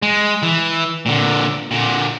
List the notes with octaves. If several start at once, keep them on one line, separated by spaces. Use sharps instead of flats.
G#3
E3
A#2 D3
A#2 D3